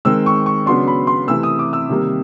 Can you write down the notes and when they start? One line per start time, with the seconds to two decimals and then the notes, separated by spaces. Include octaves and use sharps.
0.05 D#3 G#3 C4 E6
0.26 C#6
0.46 C#6
0.66 C#3 F#3 B3 D4 C6
0.87 B5
1.07 C6
1.27 C3 E3 A3 E6
1.43 D#6
1.59 D6
1.73 E6
1.89 C3 D#3 G3 A#3